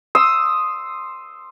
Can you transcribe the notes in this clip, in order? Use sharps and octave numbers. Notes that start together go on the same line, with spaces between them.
C6 D#6 E6